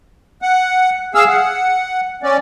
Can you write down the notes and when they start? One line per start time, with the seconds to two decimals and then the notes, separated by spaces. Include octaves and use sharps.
0.42 F#5
1.15 G#4 F5 E6
1.28 F#5
2.23 C#4 D5